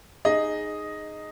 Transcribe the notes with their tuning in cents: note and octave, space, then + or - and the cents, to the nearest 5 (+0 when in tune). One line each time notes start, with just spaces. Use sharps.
D#4 -15 G#4 +0 D#5 +0